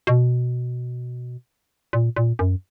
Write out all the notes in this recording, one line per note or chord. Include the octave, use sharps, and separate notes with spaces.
B2
A#2
A#2
F#2